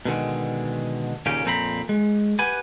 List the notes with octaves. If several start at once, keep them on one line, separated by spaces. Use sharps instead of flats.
B2 D3 D#3 G#3
D#2 A#2 C#3 C#4 G4
F2 A#2 C4 A#5 B5
G#3
G4 B4 F#5 G#5